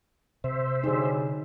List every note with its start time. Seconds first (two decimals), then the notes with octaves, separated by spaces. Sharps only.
0.44 C3 C5 E5
0.84 D3 F#3 G3 D#4 G#4